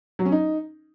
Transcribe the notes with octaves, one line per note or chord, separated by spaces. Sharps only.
F#3
C#4
D#4